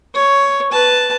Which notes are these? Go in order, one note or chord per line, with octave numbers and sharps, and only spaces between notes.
C#5
B4 A5